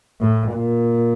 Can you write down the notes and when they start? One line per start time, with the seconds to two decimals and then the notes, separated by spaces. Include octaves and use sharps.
0.21 A2
0.53 A#2